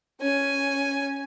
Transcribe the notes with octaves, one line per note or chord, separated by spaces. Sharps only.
C#4 G#5